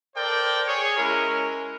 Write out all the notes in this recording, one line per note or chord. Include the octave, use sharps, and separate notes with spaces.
A4 A#4 C5 D5 G5
G#4 C#5
G#3 C#4 E4 A#4